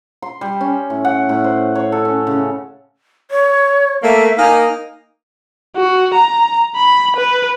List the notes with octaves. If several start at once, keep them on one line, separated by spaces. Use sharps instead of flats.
C6
G3
C#4
A2
F#5
A2
C5
C#5
A4
C#4
C#3
C#5
A3 A#3 E5
A#3 D#4 G#5
F#4
A#5
B5
B4